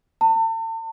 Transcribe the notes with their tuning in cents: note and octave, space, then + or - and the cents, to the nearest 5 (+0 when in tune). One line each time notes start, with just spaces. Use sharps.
A5 +40